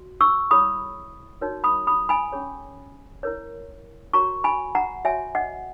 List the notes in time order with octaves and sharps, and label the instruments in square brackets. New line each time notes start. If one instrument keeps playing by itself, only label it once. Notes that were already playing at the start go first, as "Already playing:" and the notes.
Already playing: [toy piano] F#4
C#6 E6
E4 G#4 C#5 B5 D#6
D#4 F#4 A#4 C#5
B5 D#6
B5 D#6
G#5 B5
C#4 G#4 C#5
E4 A#4 C#5
F#4 A#4 C#5 A#5 C#6
G#5 B5
F#5 A#5
F#4 C#5 E5 G#5
D#5 F#5